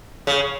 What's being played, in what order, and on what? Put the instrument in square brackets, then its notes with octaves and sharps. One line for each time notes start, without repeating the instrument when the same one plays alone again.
[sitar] C#3